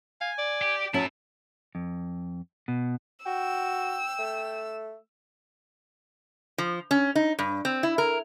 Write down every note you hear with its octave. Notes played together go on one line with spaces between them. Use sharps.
F5 G#5
D5
G4
F#3 C#4 E4 A4 A5
F2
B2
F#4 G5 E6
A3
F3
C#4
D#4
G2
C4
E4
A#4